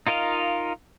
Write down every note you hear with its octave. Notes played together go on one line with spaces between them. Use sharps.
D#4 F4 A#4 D#5 F5